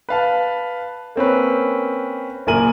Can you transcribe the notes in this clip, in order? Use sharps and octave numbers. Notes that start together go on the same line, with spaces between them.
B4 F5 A5
A#3 C4 C#4 B4
F#1 A#2 A#4 G#5 D#7 F#7